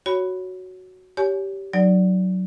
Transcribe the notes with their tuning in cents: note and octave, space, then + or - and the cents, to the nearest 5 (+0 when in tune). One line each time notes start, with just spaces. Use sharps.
F#4 +0 C#5 +5 B5 +0
G4 -10 C#5 +25 G#5 +20
F#3 +0 D#4 -25 D5 -10